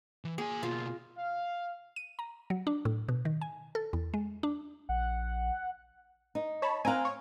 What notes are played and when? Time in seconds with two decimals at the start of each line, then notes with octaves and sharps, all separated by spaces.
0.25 E3
0.38 A#3 G#4 G#5
0.63 B2 A#3 F4
1.18 F5
1.96 D#7
2.19 A#5
2.50 F#3
2.67 D4
2.85 A2
3.09 B2
3.25 D#3
3.41 G#5
3.75 A4
3.93 E2
4.14 G#3
4.43 D4
4.89 A#1 F#5
6.35 D#4
6.62 C#5 A5 B5
6.85 C4 F5 G#5 A#5 F#6
7.05 C#5